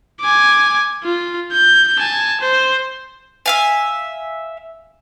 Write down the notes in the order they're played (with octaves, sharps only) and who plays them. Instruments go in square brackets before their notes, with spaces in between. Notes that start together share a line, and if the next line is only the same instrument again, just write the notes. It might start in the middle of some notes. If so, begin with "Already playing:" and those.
[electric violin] G#5 D6
F4
G6
G#5 A5
C5
[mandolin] E5 F5 G#5